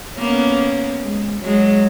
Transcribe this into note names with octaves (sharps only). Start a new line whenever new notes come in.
A#3 B3 C#4
G#3
F#3 G#3